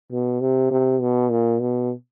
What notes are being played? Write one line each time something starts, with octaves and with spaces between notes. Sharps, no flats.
B2
C3
C3
B2
A#2
B2